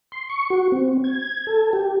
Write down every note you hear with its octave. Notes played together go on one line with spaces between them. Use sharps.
C6
C#6
F#4
C4
G#6
A4
G4